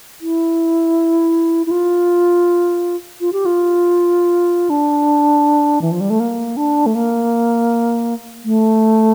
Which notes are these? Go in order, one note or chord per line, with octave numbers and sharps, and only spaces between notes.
E4
E4
F4
F4
G4
F4
D4
E3
F3
G3
A3
A#3
D4
A3
A#3
A3